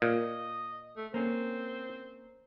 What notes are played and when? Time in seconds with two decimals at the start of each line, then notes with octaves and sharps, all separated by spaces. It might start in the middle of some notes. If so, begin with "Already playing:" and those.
0.02 A#2 D#5
0.97 A3
1.14 A#3 C4 C#4